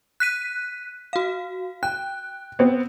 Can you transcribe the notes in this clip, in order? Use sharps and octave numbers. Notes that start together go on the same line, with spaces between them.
F#6 B6 D#7
F#4 F5
G5 F#6
B3 C4